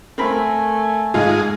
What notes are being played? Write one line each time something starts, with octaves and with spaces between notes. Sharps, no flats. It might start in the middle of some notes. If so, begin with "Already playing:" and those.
A3 C4 A#4 G#5 B5
G#1 G#2 G#3 D#4 F4 G#4